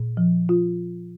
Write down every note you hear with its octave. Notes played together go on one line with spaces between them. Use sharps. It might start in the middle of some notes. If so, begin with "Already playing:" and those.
Already playing: A#2
F3
F4